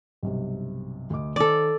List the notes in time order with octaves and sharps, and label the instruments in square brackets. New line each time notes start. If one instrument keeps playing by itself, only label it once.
[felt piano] B1 G2 C3
D2 D#5 D6
[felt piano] D#3 C5 [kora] A4 D5